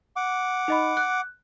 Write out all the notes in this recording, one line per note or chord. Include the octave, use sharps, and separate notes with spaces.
F#5 D6
D#4 D#5 B5
F#6